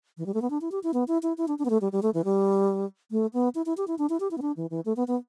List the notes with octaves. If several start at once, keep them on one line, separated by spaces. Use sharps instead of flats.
E3
G3
A3
B3
D4
E4
G4
E4
B3
E4
E4
E4
D4
D4
B3
A3
G3
G3
A3
E3
G3
A3
B3
E4
E4
G4
E4
D4
E4
G4
E4
B3
D4
E3
E3
A3
B3
B3